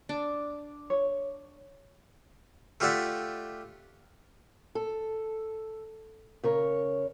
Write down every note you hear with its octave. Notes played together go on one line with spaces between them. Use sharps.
D4
C#5
A3 F4 G4 D5 E5 F#5
A4
C#3 A#4 C#5